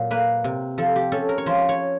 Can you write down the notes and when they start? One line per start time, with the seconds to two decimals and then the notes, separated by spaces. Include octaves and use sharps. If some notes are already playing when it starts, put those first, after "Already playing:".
Already playing: A#2 F#3
0.11 A#3 B4
0.44 C3
0.78 F3 A4
0.96 G4
1.12 C#4 A4
1.29 A#4
1.38 C#5
1.46 F3 C5
1.69 C#5